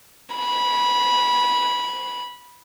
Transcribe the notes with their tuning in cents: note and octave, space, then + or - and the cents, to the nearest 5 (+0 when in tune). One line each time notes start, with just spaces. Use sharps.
B5 -20